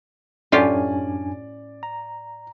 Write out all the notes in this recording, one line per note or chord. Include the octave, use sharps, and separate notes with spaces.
F#2 A2 C#4 D4 F4 G4 D5 G#5
A#5